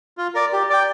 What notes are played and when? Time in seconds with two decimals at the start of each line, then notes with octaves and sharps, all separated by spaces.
0.18 F4
0.35 A#4 D5
0.53 G4
0.70 D5 G5